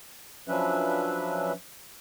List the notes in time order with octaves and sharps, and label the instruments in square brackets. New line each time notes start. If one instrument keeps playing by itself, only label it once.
[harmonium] F3 F#3 C#4 D4 B4 E5